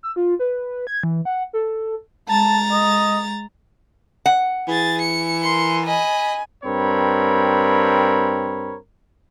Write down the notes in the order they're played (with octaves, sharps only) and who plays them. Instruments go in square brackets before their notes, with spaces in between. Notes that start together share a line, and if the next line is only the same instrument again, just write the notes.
[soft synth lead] E6
F4
B4
G#6
E3
F#5
A4
[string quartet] G#3 A#5 A6 [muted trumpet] A5
[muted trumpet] D#5
[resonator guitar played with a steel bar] F#5
[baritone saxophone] E3 [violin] G#4 A6
[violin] C#7
[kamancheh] A#4 C6
[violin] D#5 B5 [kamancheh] G#5
[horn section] G2 C4 A#4 C#5 B5